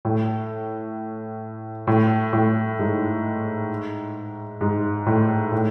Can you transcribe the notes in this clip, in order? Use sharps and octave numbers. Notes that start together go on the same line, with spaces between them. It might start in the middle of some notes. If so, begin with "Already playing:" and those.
A2
A2
A2
G#2
G#2
A2
A2